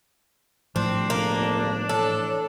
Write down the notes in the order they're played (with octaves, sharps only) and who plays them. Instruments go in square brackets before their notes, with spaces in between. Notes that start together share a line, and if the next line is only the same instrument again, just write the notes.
[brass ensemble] C2 [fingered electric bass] A2 F3 [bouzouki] C4 [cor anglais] D4
[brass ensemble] G1 C#2 [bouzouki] A#3
[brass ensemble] E3 A3 C#5 [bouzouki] A4